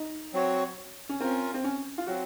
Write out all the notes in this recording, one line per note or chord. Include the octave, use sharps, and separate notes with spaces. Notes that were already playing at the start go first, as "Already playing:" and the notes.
Already playing: D#4
F#3 C4 F#4 C#5
C#4
C4 C#4 F4 A#4
C4
C#4
F4
F#3 C4 F#4